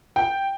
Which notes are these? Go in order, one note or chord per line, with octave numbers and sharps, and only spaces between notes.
G5